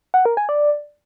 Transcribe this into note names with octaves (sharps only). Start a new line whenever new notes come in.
F#5
A#4
G#5
D5